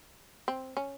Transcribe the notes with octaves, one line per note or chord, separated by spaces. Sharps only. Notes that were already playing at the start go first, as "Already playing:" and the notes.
C4
C#4